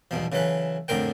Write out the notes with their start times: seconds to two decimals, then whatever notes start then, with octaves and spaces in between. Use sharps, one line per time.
0.11 B1 E2 B2 F3
0.32 C#3 E3 F#3 A4 B4
0.88 F2 A2 D3 A#4 C5 G5